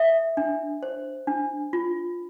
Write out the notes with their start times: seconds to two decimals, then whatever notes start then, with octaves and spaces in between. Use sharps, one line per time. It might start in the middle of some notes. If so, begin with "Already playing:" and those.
Already playing: A4 E5
0.37 D4
0.83 C5
1.27 D4
1.73 F4